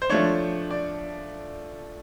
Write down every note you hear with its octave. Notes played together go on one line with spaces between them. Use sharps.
C5
F3 A3 D4 C#5
D5